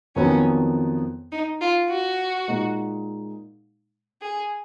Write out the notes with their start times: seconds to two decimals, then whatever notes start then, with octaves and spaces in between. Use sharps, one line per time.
0.16 F2 D#3 F#3 B3 C#4
1.32 D#4
1.61 F4
1.89 F#4
2.48 A#2 G#3 D#4
4.22 G#4